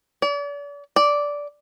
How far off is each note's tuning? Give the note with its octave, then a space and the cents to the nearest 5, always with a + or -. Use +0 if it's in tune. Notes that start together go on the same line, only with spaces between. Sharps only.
D5 -40
D5 -10